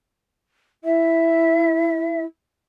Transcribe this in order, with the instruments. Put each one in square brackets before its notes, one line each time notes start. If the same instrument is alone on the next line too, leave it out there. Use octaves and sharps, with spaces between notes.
[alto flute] E4 [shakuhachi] E5